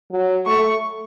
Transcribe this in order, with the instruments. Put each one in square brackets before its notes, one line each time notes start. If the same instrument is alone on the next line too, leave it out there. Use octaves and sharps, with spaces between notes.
[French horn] F#3
[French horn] A3 [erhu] C#6